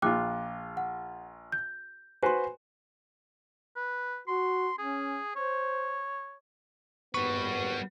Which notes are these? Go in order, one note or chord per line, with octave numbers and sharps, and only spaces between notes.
A#1 F4 G5 D6 F#6
F#5
G6
F#4 B4 C5 G#5 C6
B4
F#4 C6
C#4 G#4
C5 C#5
G#1 D#2 G3 B3 B4 C#6